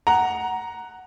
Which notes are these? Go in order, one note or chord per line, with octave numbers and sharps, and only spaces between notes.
F#5 A#5